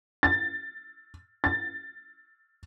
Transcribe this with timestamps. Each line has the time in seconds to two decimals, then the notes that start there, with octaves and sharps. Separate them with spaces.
0.23 A6
1.44 A6